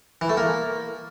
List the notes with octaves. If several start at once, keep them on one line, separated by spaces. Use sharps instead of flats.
E3
A3
A#3